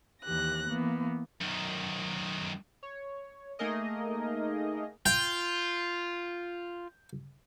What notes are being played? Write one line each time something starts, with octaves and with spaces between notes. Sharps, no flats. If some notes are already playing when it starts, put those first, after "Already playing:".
D#2 E3 G4 F#6 A#6
E3 A#3 B3
F#2 D#3
C#5
A3 A#3 D#4 G#4 A#4 D#5
F4 G5